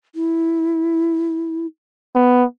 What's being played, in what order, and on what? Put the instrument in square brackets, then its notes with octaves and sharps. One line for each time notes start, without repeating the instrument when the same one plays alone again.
[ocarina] E4
[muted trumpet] B3